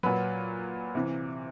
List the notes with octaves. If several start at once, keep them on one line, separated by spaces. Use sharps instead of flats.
A#2 F#3 B4
C3 E3